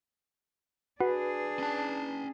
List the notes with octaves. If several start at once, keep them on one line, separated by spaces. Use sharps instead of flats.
D4 F#4 G#4 B4
C#4 A5